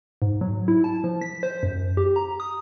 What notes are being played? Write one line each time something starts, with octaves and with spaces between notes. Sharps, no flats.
G#2
F#3
E4
A5
F3
B6
C5
F#2
G4
A#5
D#6